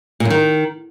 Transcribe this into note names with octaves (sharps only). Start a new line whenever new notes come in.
A#2
F#2
D#3